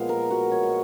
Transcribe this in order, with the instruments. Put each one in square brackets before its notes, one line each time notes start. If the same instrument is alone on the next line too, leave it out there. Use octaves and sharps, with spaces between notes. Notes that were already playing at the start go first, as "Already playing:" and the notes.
Already playing: [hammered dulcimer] A#2 F3 G#3 B3 F5
A#4
F#4
C#5
D#5